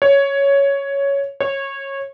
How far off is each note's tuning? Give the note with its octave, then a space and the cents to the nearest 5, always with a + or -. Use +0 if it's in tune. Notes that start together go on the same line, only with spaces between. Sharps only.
C#5 +5
C#5 -20